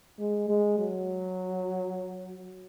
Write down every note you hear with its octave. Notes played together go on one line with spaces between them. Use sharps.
G#3
G#3
F#3